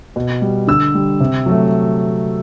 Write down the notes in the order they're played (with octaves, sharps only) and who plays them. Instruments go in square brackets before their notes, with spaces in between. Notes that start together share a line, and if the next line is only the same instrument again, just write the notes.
[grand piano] B2
G3
D3 E6
G3
C3
F#3 A3